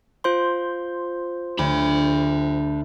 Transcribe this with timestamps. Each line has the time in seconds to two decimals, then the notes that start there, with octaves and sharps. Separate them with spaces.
0.24 F4 C5 C6
1.59 D2 D4 B5